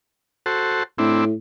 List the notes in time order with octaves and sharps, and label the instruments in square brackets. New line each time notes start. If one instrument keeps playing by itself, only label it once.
[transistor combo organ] F#4 A4 C5
[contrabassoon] A2 [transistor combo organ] C4 D4 E4